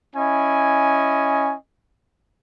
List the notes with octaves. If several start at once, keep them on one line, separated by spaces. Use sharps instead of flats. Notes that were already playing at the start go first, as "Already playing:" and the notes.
C#4 E4 D#5 G#5